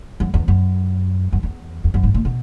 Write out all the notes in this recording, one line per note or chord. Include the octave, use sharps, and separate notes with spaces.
F#2
E2
F#2
F#2
E2
E2
F#2
G#2
A#2
B2